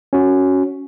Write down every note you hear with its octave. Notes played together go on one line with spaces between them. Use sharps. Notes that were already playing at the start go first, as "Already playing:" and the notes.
C#4 F#4